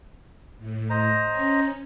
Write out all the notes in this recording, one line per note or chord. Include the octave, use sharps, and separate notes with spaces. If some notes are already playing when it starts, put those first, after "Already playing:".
A2
C5 D#5 A#5
C#4